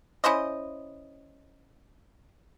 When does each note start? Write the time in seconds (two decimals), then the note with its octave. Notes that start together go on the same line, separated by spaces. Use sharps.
0.24 C#4 E4 C5 D#5